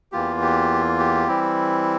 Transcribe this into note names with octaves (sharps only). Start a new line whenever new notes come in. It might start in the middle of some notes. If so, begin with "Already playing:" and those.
E2 E3 A#3 F4 G4
G4
G4
E3 G3 C4 E4